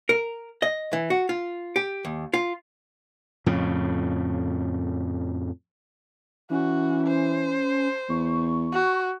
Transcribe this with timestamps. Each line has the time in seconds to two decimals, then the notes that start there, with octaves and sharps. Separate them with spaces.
0.09 A#4
0.62 D#5
0.93 E3
1.10 F#4
1.29 F4
1.76 G4
2.05 D#2
2.33 F4
3.46 F2 A2 C#3
6.50 E3 C#4 F#4
7.07 C5
8.09 E2 C#6
8.72 F#4